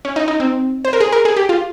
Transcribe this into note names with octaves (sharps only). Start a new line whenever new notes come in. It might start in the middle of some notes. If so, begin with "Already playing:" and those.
C#4
D#4
D#4
C4
C5
A#4
G#4
A#4
G#4
G4
F4